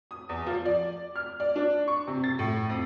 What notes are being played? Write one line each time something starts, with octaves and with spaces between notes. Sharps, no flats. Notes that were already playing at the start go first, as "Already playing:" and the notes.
D#6
E2
F3
D5
F6
D5
D4
C#6
C3
A6
A2
F2